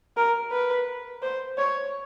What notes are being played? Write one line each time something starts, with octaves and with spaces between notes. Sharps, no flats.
A#4
B4
C5
C#5